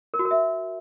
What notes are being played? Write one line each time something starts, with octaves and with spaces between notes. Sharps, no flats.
A#4
F#4
A#4
E5